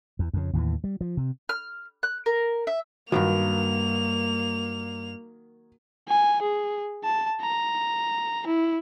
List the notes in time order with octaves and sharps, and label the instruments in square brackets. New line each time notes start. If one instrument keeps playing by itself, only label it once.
[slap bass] E2
F2 C#3
D#2 A2 E3
G3
F3
C3
[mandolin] F6
F#6
A#4
E5
[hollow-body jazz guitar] C2 G2 [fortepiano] D#3 F#3 [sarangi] A#3 [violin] F7
[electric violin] G#5
G#4
A5
A#5
E4